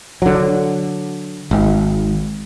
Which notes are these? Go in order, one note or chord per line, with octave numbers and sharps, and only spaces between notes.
D3 F#3
G#1